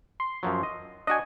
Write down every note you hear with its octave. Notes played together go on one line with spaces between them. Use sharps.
C6
F#2 F3 F#3
D#5
D4 F#4 D#5 G#5